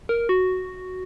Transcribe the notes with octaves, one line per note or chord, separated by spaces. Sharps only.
A#4
F#4